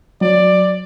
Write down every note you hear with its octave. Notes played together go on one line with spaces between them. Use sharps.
F#3 D5